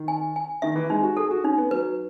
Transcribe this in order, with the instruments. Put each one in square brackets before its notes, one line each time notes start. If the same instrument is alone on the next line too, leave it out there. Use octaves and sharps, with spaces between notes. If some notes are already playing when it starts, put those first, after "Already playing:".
Already playing: [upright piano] D#3
[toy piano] G#5
G#5
[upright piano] D#3 [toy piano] E5
[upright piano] E3
[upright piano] G#3 [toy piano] D#4
[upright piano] F#4
[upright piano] G#4 [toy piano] A4
[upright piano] F#4
[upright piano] C#4 [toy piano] D#4
[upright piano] B3
[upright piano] F#3 [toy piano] B4